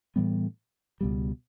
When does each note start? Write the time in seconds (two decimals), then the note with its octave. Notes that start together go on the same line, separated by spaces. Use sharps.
0.16 A2 E3 G3 B3
1.01 C#2 B2 G3